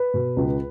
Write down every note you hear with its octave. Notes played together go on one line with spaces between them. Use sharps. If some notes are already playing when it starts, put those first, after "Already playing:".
Already playing: B4
B2
C#2